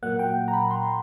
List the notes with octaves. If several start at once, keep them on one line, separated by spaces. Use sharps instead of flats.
A#2 F#3 A#3 F#5
G5
A#5
B5
C6